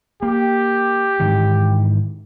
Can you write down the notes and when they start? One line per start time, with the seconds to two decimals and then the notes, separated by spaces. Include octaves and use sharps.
0.23 A#3 G4
1.20 G#2 D#3 E3